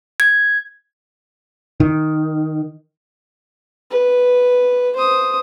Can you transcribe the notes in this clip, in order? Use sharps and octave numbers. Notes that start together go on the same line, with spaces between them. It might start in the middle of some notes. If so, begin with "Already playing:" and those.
G#6
D#3
B4
C5 D#6